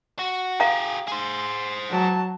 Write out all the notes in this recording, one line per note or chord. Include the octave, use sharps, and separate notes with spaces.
F#4
G4 G#4 F5 A#5
G#4 C5
F#3 A5